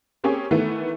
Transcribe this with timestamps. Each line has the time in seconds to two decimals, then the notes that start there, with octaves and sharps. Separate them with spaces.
0.24 A#3 C4 C#4 G4 G#4 C#5
0.51 D#3 E3 A3 B3